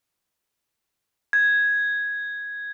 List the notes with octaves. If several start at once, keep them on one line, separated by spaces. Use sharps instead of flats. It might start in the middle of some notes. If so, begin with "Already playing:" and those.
G#6